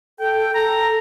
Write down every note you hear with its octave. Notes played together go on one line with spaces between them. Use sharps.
A4 G5
A4 A#5